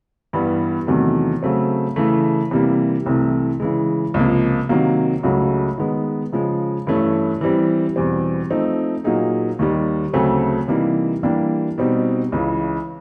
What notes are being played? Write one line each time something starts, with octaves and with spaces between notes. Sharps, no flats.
G2 E3 G3 B3
E2 C3 D#3 F#3 A3
C#3 F#3 A3 C4
C#3 E3 A3
C3 E3 G3 A#3
C2 C3 E3 A3
C#3 E3 G#3
C#2 C3 F3 A#3
C3 D#3 F#3 A#3
C#2 C#3 F#3 A3
D#3 G#3 B3
C#3 F3 G#3
G2 E3 A3 C#4
E3 G3 C4
E2 B2 G3 C4
F3 A3 C4 D#4
A#2 F#3 A#3 D#4 G#4
D#2 D#3 G3
D2 C#3 F#3 A3 C4
C3 E3 G3 A#3 D#4
E3 G3 A#3 D4 G4
B2 G3 C4 D#4
C#2 C#3 E3